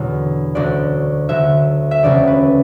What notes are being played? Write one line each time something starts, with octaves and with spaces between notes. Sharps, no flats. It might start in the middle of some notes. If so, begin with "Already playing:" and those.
Already playing: E2 B2 D3 F#3
D2 D3 F#3 D5
D2 D3 F#3 E5
E5
E1 D2 C#3 F#3 D5
B4